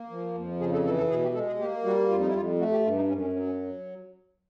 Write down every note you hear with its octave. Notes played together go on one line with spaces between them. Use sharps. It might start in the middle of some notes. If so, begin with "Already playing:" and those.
Already playing: A#3
F3
F2
C#3 G#4
A4
E3 A4
A4
B2 G#4
G4
G#3 A4
G#4
A#3 G4
G3 F#4
F2 F4
D#4
E4
F2 F4
A3 F#4
G4
G2 F4
D#4
F#2 C#4
C#4
F#3 C#4
C#4